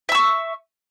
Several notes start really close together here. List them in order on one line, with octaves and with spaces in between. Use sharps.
E5 E6 C#6